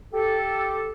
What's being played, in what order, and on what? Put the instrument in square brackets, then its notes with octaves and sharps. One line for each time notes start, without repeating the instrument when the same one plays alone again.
[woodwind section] G4 A4